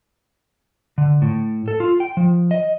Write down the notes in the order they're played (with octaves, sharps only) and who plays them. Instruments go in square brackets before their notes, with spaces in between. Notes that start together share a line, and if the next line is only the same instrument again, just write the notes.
[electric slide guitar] D3
A2
A4
F4
G5
F3
D#5